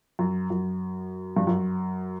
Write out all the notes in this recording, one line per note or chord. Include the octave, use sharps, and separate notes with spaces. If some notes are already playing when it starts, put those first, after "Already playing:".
F#2
F#2
G2
F#2